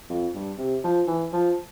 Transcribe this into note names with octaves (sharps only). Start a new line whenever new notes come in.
F2
G2
C3
F3
E3
F3